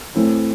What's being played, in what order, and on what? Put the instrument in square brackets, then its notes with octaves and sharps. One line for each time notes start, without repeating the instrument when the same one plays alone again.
[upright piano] A2 E3 A3 C4 E4